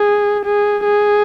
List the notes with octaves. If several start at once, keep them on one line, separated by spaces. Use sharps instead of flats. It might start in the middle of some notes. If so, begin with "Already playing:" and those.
Already playing: G#4
G#4
G#4